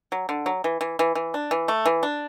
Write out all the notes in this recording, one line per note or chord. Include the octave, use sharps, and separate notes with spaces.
F#3
D3
F#3
E3
E3
E3
E3
D4
E3
A3
E3
D4